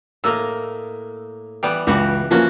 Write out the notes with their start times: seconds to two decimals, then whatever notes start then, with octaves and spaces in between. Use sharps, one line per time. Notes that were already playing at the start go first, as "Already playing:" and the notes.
0.24 A2 A#3 D#5 E6
1.63 E3 G3 B3 G5
1.87 C#2 E3 F#4 G4
2.31 E3 F3 A#3 C#4 F#4